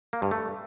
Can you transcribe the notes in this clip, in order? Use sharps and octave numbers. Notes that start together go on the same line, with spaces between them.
A#3
G2
A3